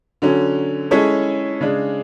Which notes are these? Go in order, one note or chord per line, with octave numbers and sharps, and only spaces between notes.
D3 F#3 C#4
G#3 C#4 E4 A4 C#5
C#3 G#3 D4